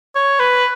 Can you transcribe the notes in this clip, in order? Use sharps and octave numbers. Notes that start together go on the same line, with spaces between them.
C#5
B4